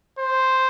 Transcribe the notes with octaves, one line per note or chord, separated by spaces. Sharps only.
C5